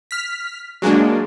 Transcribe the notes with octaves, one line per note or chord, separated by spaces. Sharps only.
F6 B6
F#3 G#3 A#3 D4